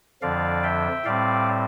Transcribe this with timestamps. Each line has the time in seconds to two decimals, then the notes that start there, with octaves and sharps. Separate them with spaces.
0.22 F2 D3 F3 D5 F5
0.63 E5 G5
1.05 A2 G3 C4 D5 F5